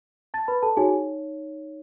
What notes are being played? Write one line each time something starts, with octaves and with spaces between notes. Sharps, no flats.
A5 A6
B4 B5
A4 A5
D#4 F#4 G#4 C#5 G#5